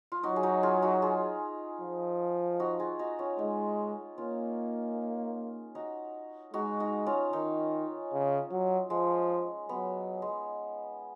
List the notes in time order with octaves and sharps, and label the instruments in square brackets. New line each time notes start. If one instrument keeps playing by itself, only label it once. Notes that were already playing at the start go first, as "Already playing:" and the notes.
[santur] F4
[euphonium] F#3 [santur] D#4 F#4
[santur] G#4
D#4 F#4
F4 G#4
D#4 F#4
F4 G#4
[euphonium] F3
[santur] D#4 F#4
F4 G#4
D#4 F#4
C#4 F4
[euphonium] G#3 [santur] D#4
[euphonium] A#3 [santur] C#4 F4
[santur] D#4 F#4
[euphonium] G#3 [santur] D#4 F#4
[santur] D#4 F#4
C#4 F4
[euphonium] D#3 [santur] D#4
[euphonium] C#3
F#3
[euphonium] F3 [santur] G#3
[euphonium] F#3 [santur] B3
[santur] G#3